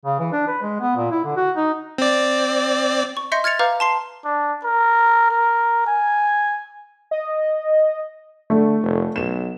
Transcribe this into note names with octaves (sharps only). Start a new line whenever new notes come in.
C#3
E3
D4
B4
G#3
B3
A#2
E4
D3
F#4
D#4
C4 D5
C#6
D#5 E5 C6 G6 A#6 C#7
F6 G#6 A6 C#7 F7
B4 F5 A#5 D6 F6 G6
A5 C6 C7
D4
A#4
A#4
G#5
D#5
D3 A3
F1
B1 E7